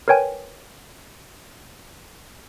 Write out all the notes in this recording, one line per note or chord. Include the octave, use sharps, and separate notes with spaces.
A#4 B4 C#5 G5 G#5